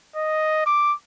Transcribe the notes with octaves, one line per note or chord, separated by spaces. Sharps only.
D#5
D6